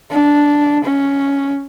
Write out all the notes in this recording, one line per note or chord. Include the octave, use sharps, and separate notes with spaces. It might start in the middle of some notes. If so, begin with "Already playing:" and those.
D4
C#4